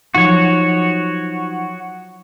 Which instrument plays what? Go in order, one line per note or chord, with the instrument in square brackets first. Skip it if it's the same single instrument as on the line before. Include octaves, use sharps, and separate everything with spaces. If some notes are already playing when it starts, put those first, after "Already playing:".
[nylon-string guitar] F3 F#3 D#4 [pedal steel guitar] F#4 C#5